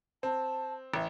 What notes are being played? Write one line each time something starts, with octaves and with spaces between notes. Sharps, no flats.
C4 A5
A1 E5